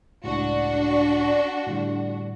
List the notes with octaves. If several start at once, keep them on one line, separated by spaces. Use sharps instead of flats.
G1 C#2 A2 D4 F#4
A2 D3 G3